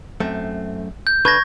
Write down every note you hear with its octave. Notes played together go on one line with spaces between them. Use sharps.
F#2 A3 C4
G6
D3 A4 B4 C#6 G#6 A#6